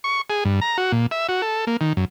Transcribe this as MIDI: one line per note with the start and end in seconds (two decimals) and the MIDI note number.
0.04 0.21 85
0.30 0.44 68
0.45 0.60 43
0.61 0.77 82
0.78 0.92 66
0.92 1.06 46
1.11 1.27 76
1.29 1.42 66
1.42 1.65 69
1.67 1.77 58
1.81 1.93 51
1.97 2.05 42